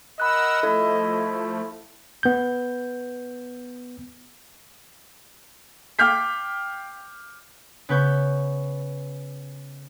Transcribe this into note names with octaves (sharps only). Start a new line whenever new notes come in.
A#4 D#5 F#5 B5 E6 F#6
F3 A3 E4 A4
B3 G6
F5 G5 D6 F6 G6 B6
C#3 B3 B4 C#6 G6